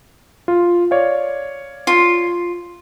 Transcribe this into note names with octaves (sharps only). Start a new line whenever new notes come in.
F4
C#5 D5 F5
F4